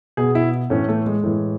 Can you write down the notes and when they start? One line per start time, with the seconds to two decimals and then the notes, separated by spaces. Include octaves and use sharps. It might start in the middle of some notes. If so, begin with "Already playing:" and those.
0.17 B2 G#4
0.35 E4
0.70 A2 E3 C#4
0.88 A3
1.06 G#3
1.23 A2 E3